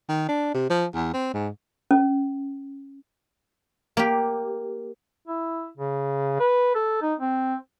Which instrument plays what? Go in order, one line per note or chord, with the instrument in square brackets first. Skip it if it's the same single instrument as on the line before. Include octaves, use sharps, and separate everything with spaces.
[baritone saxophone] D#3
D4
C3
F3
E2
C4
G#2
[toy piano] C#4
[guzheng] A#3 G4
[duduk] E4
C#3
B4
A4
D#4
C4